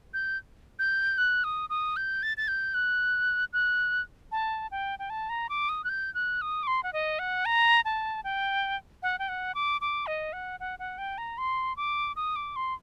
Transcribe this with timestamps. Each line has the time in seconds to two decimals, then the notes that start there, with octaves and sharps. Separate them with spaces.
0.14 G6
0.79 G6
1.18 F#6
1.44 D#6
1.70 D#6
1.96 G6
2.23 A6
2.37 A6
2.48 G6
2.74 F#6
3.53 F#6
4.32 A5
4.71 G5
4.99 G5
5.10 A5
5.29 A#5
5.49 D6
5.69 D#6
5.84 F#6
5.89 G6
6.15 F#6
6.42 D#6
6.63 D6
6.67 C6
6.83 F#5
6.93 D#5
7.19 F#5
7.46 A#5
7.85 A5
8.24 G5
9.03 F#5
9.19 G5
9.29 F#5
9.55 D6
9.81 D6
10.07 D#5
10.33 F#5
10.60 F#5
10.79 F#5
10.98 G5
11.18 A#5
11.38 C6
11.77 D6
12.16 D#6
12.36 D6
12.56 C6